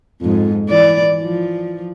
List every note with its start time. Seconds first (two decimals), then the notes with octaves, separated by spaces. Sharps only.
0.22 F2 G#2
0.69 E3 D5
1.22 F3